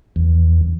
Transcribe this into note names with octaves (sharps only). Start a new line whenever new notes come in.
E2